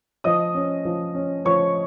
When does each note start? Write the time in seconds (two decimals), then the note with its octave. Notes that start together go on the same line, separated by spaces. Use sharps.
0.24 F3 D#5 D#6
0.54 C#4
0.85 F3
1.14 C#4
1.45 F3 C#5 C#6